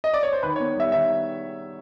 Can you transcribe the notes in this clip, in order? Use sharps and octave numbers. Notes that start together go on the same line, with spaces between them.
D#5
D5
C#5
C5
D#3 B4
C#5
B3
G3 E5
D#3 E5